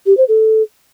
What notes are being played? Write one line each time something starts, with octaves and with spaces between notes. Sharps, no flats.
G4
C5
A4